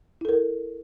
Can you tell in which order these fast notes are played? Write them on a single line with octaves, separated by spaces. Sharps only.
E4 A4 A#4